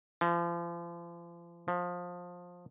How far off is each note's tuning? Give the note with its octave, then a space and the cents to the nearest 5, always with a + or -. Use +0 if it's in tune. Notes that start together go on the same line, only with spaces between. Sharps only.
F3 -35
F3 +20